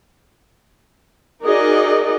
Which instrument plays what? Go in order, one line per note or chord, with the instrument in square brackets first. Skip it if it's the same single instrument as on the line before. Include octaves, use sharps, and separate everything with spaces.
[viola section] D#4 F#4 G#4 A#4 D5 D#5